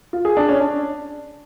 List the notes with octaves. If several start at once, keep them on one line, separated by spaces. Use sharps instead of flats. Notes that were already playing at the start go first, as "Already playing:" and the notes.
F4
G#4
D4
C#4
D4